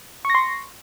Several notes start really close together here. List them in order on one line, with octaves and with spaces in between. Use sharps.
C#6 A#6 C6